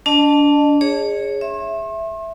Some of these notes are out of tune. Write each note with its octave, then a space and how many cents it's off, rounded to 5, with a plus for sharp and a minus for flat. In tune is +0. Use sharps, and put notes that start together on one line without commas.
D4 -30 D#5 -40 A5 +0
G#4 -10 C#5 +0
E5 +0 C6 +45